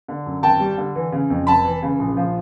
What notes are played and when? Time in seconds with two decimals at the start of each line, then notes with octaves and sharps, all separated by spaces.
0.08 D3
0.26 F#2
0.43 G#1 G5 A5
0.60 G3
0.78 D3
0.95 E3
1.12 C#3
1.30 F2
1.47 F1 A5 B5
1.65 E3
1.83 C#3
1.99 A#1
2.17 F3